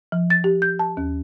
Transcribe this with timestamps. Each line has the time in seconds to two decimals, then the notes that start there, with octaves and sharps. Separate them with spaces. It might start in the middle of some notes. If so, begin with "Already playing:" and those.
0.12 F3
0.30 A6
0.44 G4
0.62 G6
0.79 A5
0.97 D#2